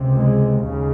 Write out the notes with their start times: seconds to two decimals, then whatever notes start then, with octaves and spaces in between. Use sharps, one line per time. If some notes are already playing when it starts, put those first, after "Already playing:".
Already playing: C#2 C3
0.15 G#3
0.62 D#2 C#3